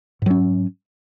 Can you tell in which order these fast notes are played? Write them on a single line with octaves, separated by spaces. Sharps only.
G#2 F#3 C#4